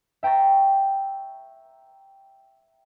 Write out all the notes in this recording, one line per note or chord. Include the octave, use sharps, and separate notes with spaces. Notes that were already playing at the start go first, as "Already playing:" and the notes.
E5 G5 A#5 C#6 A6